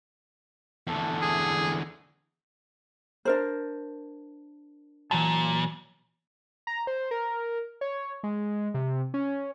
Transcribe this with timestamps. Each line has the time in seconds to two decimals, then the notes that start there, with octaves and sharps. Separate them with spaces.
0.87 E2 D3 A3
1.22 G#4
3.25 D4 A#4 C5
5.11 A#2 E3 F#3 A5
6.67 A#5
6.87 C5
7.11 A#4
7.81 C#5
8.23 G#3
8.74 C3
9.14 C#4